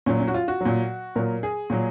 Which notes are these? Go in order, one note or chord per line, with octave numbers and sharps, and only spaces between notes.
A#2 F#3 C#4
C#4
F#4
F4
F#4
A#2 F#3
A#2 F#3 A#4
G#4
A#2 F#3